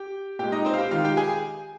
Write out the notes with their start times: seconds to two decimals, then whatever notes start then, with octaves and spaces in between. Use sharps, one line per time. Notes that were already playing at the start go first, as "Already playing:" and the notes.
Already playing: G4 G5
0.39 A#2 G#3 G4 G5
0.52 D#4 D#5
0.65 C4 C5
0.74 F5
0.78 G4 G5
0.91 D#3 G#3 F4 F5
1.05 G4 G5
1.17 G#4 G#5